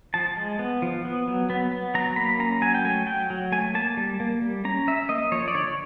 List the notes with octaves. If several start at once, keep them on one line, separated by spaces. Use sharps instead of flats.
F3 A5
G#3
B3
F3
B3
F#3
B3
B3
F#3 A#5
A#3 B5
C#4 A#5
F#3 G#5
G5
A3 G#5
F#3 G5
F#3
A3 G#5
A#3 A5
G3
A#3
G3
C#4 A#5
C#4 E5
A#3 D#5
F3 C#5
D5
D3 C#5